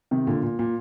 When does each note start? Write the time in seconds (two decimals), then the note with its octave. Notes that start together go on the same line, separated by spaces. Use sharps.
0.11 C3 D#3
0.27 A#2 D3
0.43 A#2
0.59 A#2